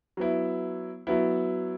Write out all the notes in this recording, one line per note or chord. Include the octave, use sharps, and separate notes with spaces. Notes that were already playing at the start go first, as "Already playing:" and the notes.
F#3 B3 E4
F#3 B3 E4